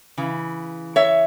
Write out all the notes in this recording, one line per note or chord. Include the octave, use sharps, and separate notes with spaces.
C#3 E3
C#5 E5